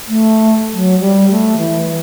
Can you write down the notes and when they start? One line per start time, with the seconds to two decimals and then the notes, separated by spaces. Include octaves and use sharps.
0.08 A3
0.73 F#3
1.00 G3
1.31 A3
1.58 E3